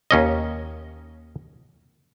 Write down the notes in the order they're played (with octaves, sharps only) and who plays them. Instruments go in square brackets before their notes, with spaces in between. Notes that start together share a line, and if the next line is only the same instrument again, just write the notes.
[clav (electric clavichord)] D#2 C#4 D#5